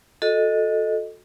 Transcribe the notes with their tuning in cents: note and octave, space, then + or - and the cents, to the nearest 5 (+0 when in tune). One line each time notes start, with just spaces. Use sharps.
F#4 -30 A4 +0 D#5 +0